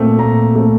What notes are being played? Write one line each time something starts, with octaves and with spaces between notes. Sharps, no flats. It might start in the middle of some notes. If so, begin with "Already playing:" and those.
Already playing: A#2 A3 C4
A#2 A#5
A3 C4